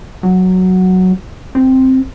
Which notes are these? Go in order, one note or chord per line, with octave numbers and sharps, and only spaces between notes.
F#3
C4